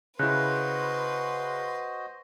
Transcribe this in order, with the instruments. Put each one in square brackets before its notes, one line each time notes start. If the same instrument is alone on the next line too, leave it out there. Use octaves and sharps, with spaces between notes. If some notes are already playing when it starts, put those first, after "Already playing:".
[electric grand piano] C#3 E4 [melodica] F#4 C5 D#5 [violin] B4 C6 [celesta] F#6